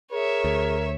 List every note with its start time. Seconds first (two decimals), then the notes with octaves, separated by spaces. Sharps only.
0.12 G#4 A#4 C#5 E5
0.44 D2